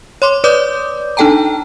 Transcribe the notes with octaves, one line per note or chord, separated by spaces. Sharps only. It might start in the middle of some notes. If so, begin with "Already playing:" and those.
C#5 C6 D6
B4 C#5 D5 D6 D#6 G6
D4 D#4 A4 G5 A5 A#5